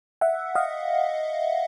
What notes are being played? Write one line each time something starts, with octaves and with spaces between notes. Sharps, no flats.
E5 F#5
D#5 F5